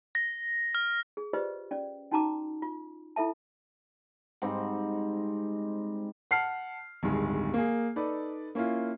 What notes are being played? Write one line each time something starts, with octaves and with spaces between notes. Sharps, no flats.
A#6
F6
G#4
F4 G4 B4 C5 D5 D#5
C#4 D5
C#4 D#4 F#4 A5 A#5 D6
F4
E4 A4 E5 A5
G#2 G3 C4 D#4
F#5 A5 F6 C7
D1 G2 D#3 G#3
A#3 G#4
D#4 A4 B4 D5
A#3 C#4 E4 F4